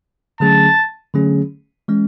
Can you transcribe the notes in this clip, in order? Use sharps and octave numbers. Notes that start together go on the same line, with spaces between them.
D3 F#3 A3 C#4 G#4 A5
D3 F#3 A3 C#4 G#4
E3 G#3 C#4